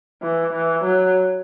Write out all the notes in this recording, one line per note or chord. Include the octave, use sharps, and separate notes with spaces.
E3
E3
F#3